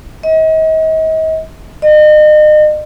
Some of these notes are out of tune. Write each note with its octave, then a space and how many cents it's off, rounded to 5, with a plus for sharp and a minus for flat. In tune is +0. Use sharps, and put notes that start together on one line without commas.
D#5 +40
D#5 -40